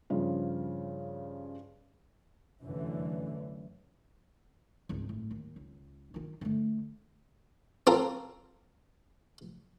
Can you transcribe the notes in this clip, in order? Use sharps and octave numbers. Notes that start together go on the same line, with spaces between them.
G2 C#3 F3
F1 F#2 D3 E3
G#1 C#2
A2
D#2
C#2
D#3 F4
D3 A3
C4 F4 A4 A#4